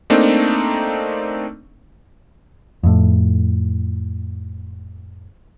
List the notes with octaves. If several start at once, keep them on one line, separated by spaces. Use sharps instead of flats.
A3 A#3 C4 D4 D#4
F2 A2